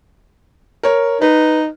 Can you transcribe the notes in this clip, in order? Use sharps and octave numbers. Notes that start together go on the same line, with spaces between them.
A#4 C#5
D#4 B4